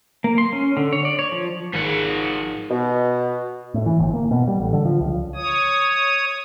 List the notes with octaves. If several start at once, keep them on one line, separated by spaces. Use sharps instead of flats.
A#3
C6
C#4
D3
C#5
D5
C#5
F3
G#1 F3 F#5
B2
A2
E3
G1
A#3
B2
G3
A1
D3
F3
C#2
C#5 D#6